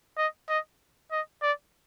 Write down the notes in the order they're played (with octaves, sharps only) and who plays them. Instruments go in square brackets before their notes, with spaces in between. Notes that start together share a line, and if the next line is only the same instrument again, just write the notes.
[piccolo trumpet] D#5
D#5
D#5
D5